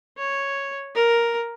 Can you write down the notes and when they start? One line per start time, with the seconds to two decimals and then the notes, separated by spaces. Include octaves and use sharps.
0.18 C#5
0.95 A#4